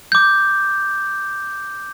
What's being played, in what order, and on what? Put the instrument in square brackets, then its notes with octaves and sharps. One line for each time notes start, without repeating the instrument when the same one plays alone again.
[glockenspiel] D6 G6